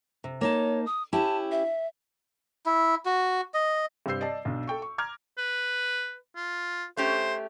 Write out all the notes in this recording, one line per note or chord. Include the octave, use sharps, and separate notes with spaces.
C3
A#3 D#4 C#5 A5
D#6
C#4 E4 G4 A5
E5
E4
F#4
D#5
G2 C3 C5 E6 G6 C7
D5 D#5 A5
B1 D4
A4 G5 C#6
C#6
A#5 D6 F6 G#6
B4
F4
A3 C#4 G4 C5